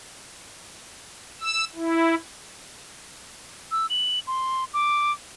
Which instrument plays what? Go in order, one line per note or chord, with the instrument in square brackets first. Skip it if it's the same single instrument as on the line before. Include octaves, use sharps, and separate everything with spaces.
[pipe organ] E6
E4
[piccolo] E6
F#7
C6
D6